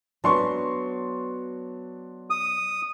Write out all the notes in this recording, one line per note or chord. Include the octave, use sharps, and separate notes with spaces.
F#3 B3 D4 C6 C#6
D#6